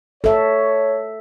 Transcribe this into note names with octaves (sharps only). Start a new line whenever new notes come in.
A4 C#5 E5